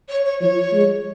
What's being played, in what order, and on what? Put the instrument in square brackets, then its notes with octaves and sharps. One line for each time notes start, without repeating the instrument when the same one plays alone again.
[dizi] C#5
C#5
[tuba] F3 [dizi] C#5
[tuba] G#3